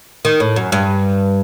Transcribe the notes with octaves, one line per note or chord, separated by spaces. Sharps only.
D#3
A2
F#2
G2